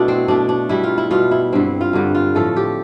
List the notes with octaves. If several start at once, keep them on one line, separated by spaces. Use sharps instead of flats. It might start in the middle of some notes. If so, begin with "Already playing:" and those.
Already playing: B2 A3 D4 E4
C4
B2 A3 D4
D4
B2 G3 E4
F4
E4
B2 G3 F4
E4
G2 D3 G3 C4
F4
G2 D3 G3
F4
A2 F3 A3 A4
G4